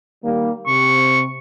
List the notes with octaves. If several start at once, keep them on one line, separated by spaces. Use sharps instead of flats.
D#3 G3 A#3
C3 C#6